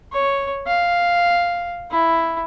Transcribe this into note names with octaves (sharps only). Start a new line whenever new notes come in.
C#5
F5
E4